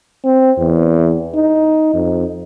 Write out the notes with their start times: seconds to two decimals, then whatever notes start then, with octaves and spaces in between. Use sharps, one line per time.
0.24 C4
0.58 E2
1.35 D#4
1.94 F2